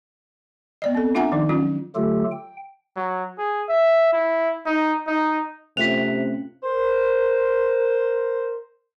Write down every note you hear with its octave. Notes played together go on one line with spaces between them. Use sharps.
B3 D5 D#5
C4 A4
D4 F4 E5 F#5 G#5 A#5
D#3 F3 D#4
F#3 C#4 F4
D3 F#3 A3 F4 G4 A4
G5
F#3
G#4
E5
E4
D#4
D#4
C3 A3 C4 C#4 F4 F#6 B6 F7
A#4 C5